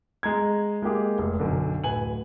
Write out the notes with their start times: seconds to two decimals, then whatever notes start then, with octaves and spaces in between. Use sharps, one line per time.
0.23 G#3 A#5 G#6
0.82 G#3 A#3 G4 G#4
1.18 F1
1.40 B1 F#2 D3
1.84 D1 B4 G#5 F#7